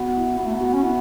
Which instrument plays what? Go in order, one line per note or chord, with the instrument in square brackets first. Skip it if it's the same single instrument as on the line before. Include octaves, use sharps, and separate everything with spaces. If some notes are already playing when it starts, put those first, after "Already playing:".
Already playing: [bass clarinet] B3 [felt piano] F#4
[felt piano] E4
[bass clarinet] B3 [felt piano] F#4
[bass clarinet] A3
B3
[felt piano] F#4
[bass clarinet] C#4
[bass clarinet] B3 [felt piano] E4